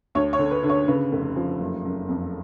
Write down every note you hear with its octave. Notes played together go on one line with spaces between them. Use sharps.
D2 C#5
C#5
D3
B4
D3
C#5
C#3 B4
F1
F3
F#1
F#1
F2